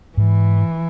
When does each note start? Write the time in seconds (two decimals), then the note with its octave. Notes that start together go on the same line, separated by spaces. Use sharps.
0.17 G#2 E3